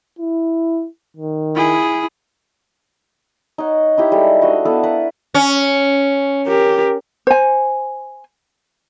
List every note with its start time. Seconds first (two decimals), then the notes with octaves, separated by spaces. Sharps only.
0.19 E4
1.17 D#3
1.55 E4 G#4
3.58 D#4 C#5 F#5
3.98 D#4 E4 G4 A#5
4.12 G3 G#3 A4 B5
4.42 D4 F#4 D#5 F5
4.65 B3 E4 A4 F5
4.83 A#4 B4 F#5
5.34 C#4
6.47 G4 A#4
7.27 C5 G#5